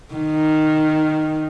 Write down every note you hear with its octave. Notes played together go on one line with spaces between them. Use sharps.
D#3